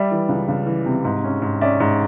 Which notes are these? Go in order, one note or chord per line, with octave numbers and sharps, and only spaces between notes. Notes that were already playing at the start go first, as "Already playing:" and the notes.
Already playing: G3 D5 E5
E3
C#2
C#2
E3
C3
G#2
C#4
G#2
C#4 D5 E5
G#2